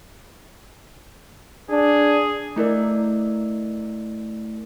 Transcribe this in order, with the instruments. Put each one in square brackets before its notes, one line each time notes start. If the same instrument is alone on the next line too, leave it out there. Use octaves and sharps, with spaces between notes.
[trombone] D4 [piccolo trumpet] G#4
[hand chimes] A3 E4 A#4 D5